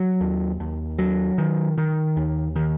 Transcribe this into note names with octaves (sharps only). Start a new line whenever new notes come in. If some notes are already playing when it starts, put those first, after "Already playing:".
Already playing: F#3
D#2
D#2
F#3
D#3
D#3
D#2
D#3